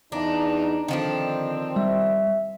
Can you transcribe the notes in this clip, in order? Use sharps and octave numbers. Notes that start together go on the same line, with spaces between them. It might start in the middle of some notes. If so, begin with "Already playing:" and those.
E2 D4 D#4 A#5
D3 D#3 F3 C4 D4
G3 E5